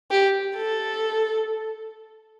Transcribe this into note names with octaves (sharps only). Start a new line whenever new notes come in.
G4
A4